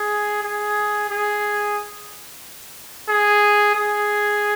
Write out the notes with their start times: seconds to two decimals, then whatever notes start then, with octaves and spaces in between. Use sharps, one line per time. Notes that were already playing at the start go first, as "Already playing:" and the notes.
Already playing: G#4
0.44 G#4
1.10 G#4
3.09 G#4
3.75 G#4